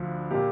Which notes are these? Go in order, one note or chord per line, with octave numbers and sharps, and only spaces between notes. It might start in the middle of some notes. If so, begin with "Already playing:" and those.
Already playing: D2 D3 F3
A#2 A#3 G4